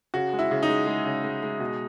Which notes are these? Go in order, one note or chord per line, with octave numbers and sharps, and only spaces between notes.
C#3 F#4
G#3
E4
C#3
D#4
G#3
G#3
C#3
G#3
G#3
B2